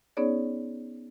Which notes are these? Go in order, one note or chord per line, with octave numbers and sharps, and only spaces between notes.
B3 C#4 D#4 G#4 C#5 D5